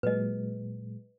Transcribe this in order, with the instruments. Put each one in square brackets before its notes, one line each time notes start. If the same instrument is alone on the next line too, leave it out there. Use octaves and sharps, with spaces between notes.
[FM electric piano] A#2 F#3 G#3 [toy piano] B4 D#5